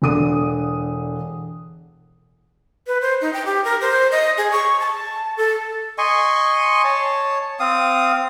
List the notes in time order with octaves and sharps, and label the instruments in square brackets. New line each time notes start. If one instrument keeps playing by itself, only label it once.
[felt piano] E1 D3 D#6 D#7
[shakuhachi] B4
C5
D#4
G5
G4
A#4
C5
D#5
G#4
C#6
A5
A4
[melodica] D#5 G#5 C6 C#6
C#5 A5
C4 F5 D#6